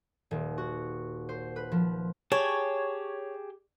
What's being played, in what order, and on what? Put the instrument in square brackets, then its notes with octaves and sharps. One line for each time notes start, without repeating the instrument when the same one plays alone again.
[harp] D#1
F#4
C5
B4
F3
[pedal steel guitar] G4 G#4 A5 [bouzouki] C#5